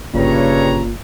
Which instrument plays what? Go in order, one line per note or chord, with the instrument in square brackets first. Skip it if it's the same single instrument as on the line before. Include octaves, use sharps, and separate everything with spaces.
[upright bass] G1 [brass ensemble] G2 C#5 A#5 [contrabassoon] A#2 [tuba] C#3